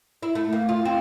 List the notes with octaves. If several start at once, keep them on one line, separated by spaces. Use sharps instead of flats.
E4
A3
A#3
F4
C4